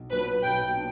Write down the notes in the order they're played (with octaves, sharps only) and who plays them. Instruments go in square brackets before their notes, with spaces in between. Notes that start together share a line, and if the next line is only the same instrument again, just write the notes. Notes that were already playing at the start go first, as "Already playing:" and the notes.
Already playing: [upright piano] B1
[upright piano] A#2 F#3 A#3 D4 [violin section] B4
[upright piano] B1 [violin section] G5
[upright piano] D4